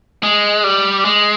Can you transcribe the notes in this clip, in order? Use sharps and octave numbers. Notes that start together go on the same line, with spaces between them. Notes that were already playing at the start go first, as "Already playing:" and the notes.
G#3
G3
G#3